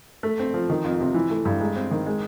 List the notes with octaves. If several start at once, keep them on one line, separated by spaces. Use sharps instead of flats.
A3
C4
F3
D#3
F2
C3
E3
A3
G2
G#3
C4
D#3
G#3